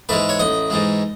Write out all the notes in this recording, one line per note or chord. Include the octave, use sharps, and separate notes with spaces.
G#2 E3 G#3 B4
C#5
A1 D#5
G#2 E3 G#3